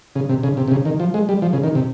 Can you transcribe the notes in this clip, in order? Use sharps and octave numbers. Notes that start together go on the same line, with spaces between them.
C#3
C3
C#3
C3
C3
C#3
D#3
F3
G#3
G3
F3
C#3
D#3
C3